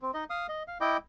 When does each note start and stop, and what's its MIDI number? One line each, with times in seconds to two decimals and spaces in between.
0.02 0.11 60
0.14 0.24 63
0.14 0.24 75
0.30 0.47 77
0.30 0.47 87
0.49 0.63 75
0.68 0.78 77
0.81 0.97 64
0.81 0.97 75
0.81 0.97 79
0.81 0.97 86